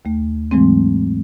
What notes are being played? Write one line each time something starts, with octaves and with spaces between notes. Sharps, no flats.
D#2 A3
G#2 E3 F#3 G#3 A3 C4